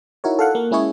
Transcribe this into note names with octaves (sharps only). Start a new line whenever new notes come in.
D#4 E4 F#4 A#4 C#5
A4 F5 F#5
A#3
G#3 C#4 E4 G#4 C#5